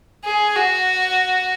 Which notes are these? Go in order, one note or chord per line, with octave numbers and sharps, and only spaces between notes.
G#4
F#4